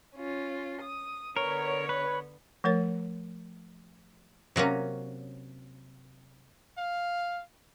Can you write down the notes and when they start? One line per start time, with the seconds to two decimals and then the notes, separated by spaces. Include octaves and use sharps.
0.15 C#4 F4
0.80 D#6
1.37 D3 B3 A#4 C#5
1.89 B4
2.64 F3 A3 A#4 C#5
4.56 C3 F#3 A#3 C#4
6.78 F5